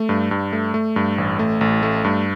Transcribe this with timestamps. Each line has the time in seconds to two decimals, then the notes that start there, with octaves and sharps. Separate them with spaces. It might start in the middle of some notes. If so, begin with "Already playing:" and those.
Already playing: A3
0.09 G2
0.31 G2
0.53 A3
0.74 A3
0.96 G2
1.18 A1
1.39 A3
1.61 A1
1.83 A3
2.04 G2